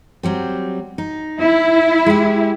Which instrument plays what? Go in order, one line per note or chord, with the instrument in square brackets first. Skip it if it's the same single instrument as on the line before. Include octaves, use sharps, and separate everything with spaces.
[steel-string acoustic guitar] F#3 G3 C4
D#4
[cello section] E4
[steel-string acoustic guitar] G#3 G4